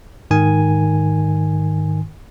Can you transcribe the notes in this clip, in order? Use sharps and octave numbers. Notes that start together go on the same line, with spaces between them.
G#2 D#3 G#5